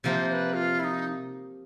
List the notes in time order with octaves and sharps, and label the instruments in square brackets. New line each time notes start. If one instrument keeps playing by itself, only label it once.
[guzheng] C3 F3 A#3 [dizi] C5
[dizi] C5
B4
F4
E4
D#4